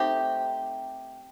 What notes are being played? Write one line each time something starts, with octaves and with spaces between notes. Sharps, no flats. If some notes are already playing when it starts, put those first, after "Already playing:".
Already playing: A3 C4 D#4 G4